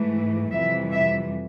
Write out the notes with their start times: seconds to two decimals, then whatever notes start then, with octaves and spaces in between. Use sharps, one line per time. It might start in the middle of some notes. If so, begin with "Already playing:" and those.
Already playing: G#2 E3 A3
0.51 F2 C3 E3 G3 E5
0.92 E5